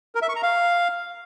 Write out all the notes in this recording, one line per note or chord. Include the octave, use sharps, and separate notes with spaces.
A#4
E5
C#6
A#5
F5